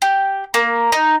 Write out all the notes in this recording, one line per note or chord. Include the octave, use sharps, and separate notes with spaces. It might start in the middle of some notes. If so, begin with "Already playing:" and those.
G4
A#3
D#4